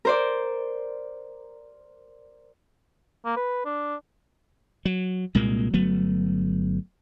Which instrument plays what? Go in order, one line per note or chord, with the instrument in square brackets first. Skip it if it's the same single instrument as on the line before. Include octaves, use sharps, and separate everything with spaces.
[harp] A#4 C5 D5
[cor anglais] A#3
B4
D4
[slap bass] F#3
C2 A#2 G#3 A#3
G1 F#3 A3 B3